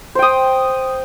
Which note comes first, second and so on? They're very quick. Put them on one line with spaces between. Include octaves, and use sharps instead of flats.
C5 G5 D#6